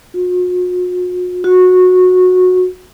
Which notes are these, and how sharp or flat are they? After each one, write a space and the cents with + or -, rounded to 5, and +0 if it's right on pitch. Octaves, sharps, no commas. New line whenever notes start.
F#4 -45
F#4 -15